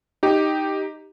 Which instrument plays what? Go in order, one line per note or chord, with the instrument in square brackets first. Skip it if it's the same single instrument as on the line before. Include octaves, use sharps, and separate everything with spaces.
[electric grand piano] D#4 G4